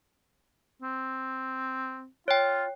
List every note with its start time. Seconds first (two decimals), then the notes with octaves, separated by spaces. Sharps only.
0.82 C4
2.28 F4 C#5 G5